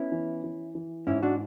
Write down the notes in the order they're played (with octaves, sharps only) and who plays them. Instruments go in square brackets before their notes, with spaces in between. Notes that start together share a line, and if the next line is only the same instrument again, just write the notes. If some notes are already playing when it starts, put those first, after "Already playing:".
Already playing: [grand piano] B3 [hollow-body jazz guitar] C#4 E4
[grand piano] E3
E3
E3
[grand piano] G#2 [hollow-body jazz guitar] C#4 E4
[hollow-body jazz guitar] D4 F#4